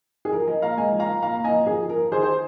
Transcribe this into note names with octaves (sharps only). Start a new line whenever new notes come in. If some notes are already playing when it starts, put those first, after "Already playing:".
G#4
F3 A#4
F3 A#4 D#5
A#2 F5 A#5
G#3 D#5 G#5
F3
F5 A#5
F3
A#2 F5 A#5
A#2 A#5
D#5 G#5
F3
F3 G#4
F3
A#4
F3
D#3 G#4 C5
C5